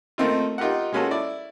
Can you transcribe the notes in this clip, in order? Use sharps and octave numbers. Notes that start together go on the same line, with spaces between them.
D#3 A3 A#3 C4 D#4 F4
D#4 F4 G4 A#4 F#5
G#3 A#3 C#4 F4 F#4 A4
E4 D5